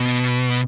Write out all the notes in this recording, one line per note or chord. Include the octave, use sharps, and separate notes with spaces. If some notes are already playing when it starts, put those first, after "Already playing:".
Already playing: B2